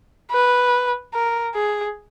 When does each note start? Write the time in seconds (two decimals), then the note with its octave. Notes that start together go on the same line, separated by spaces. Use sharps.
0.32 B4
1.14 A#4
1.55 G#4